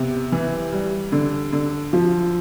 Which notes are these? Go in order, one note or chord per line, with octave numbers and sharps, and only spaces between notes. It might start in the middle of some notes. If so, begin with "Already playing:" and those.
Already playing: C3 B3
E3
G3
D3
D3
F3